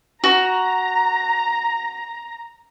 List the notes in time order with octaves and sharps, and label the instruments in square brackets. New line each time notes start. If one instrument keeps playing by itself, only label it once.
[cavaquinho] F#4 [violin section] A#5